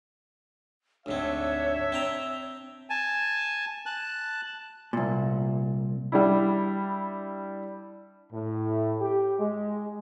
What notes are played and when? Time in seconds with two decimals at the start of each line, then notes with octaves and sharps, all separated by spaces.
1.06 D2 G#2 C4 D4 C#5 E5
1.92 C4 G5 A#5
2.90 G#5 A5
3.86 A5 F#6
4.93 C2 A#2
6.12 G3 D4 E4
8.33 A2
9.01 G4
9.39 G#3